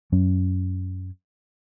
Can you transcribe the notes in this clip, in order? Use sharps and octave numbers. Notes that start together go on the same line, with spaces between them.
F#2 F#3 C#4